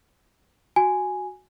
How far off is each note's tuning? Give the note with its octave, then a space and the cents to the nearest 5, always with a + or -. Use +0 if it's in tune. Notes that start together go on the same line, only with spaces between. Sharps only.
F#4 +0 G#5 +0